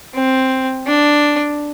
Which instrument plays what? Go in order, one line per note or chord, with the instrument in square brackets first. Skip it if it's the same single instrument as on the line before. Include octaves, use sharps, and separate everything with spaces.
[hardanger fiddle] C4
D4